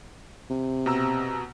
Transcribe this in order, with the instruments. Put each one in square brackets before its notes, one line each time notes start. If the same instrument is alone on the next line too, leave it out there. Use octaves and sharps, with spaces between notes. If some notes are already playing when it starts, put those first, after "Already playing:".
[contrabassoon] C3
[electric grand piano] B2 A#5 E6